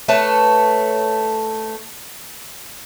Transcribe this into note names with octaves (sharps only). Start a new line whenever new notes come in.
A3 B4 C#5 A5